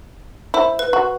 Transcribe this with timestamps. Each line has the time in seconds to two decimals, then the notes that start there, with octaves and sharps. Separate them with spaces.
0.54 E4 C5
0.79 B4
0.93 F#4